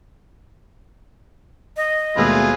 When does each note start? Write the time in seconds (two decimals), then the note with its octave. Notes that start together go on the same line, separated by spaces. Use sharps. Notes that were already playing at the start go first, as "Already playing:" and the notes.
1.77 D#5
2.17 D#2 B2 G#3 A3 F4 G#4 B4 E6